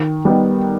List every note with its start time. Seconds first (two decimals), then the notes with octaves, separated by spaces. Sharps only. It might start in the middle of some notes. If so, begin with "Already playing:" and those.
Already playing: D#3
0.25 G3 B3 D#4